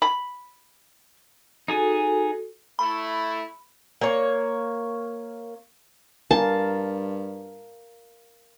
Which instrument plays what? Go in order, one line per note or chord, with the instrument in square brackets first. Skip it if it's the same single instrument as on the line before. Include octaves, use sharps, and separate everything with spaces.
[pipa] B5
[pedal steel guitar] D#4 G#4 G#5 [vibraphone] F#4 A4
[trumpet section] A3 E4 [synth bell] B5
[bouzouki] A#3 C#5
[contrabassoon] G2 [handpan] A#4 F5 [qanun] A5